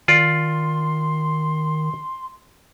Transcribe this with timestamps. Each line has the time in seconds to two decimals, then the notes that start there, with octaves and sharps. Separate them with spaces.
0.08 D#3 F4 D5 C6